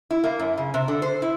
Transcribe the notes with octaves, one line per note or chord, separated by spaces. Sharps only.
E4
A#3
F#2
C#3
C3
D3
C5
E4